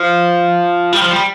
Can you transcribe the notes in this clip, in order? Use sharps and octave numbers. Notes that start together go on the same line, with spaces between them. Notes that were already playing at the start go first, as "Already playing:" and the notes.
Already playing: F3
G3
F3
G3